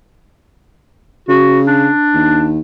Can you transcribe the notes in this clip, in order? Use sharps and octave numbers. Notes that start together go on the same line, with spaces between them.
C#3 F#4
D4
D#2